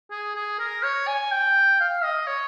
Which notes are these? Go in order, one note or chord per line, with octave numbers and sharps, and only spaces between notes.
G#4
G#4
A#4
C#5
G#5
G5
F5
D#5
C#5